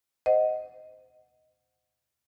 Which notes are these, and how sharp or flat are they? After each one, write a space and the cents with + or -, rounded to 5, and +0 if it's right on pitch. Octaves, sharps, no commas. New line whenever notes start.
C5 -15 D#5 +0 F#5 +0